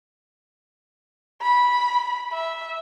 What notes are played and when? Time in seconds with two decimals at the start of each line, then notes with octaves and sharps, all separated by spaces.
1.42 B5
2.33 E5